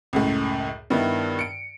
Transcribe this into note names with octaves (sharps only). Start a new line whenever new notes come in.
C#2 F#2 A2
G2 D#3 B3 E4
C#7 D7